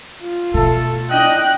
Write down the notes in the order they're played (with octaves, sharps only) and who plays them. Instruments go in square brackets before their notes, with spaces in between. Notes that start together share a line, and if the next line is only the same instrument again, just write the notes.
[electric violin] F4
[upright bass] B2 [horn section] A3 A4
[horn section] D4 E4 D#5 [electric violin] G5 F#6